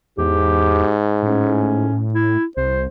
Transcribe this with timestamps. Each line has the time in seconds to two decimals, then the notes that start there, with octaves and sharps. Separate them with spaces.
0.18 E2 G#2 G4
1.23 A2 C#4
2.14 E4
2.57 C2 C5